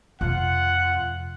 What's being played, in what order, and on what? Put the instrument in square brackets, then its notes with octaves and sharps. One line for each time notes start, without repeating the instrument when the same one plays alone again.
[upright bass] F2 C3 [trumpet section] F4 F#5